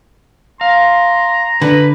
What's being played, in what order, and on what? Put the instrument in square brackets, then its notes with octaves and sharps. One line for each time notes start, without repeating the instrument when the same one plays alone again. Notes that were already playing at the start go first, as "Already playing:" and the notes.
[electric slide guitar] F5 [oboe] A#5 [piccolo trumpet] C6
[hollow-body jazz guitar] D3 [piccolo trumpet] B4